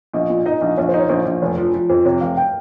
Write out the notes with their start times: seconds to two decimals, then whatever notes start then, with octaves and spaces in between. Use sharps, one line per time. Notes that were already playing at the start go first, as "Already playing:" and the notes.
0.13 A#1 D#5
0.30 A#2
0.46 D#4 D#5
0.61 A#1
0.77 A#1 C#5
0.89 C5
0.94 D#4
1.00 C#5
1.09 A#1 C5
1.25 A#1
1.42 F1 C#5
1.57 F3
1.74 F3
1.90 F2 C5
2.05 C3 C#5
2.21 F1 F5
2.37 G5